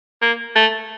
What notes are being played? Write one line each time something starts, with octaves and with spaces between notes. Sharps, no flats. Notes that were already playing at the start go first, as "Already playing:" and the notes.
A#3
A3